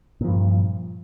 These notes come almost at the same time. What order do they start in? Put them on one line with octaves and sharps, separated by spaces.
A#2 F3 G2